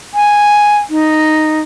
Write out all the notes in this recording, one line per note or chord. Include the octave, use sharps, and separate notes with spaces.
G#5
D#4